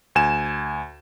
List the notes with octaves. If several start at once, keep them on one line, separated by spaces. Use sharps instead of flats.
D2 G#5 E7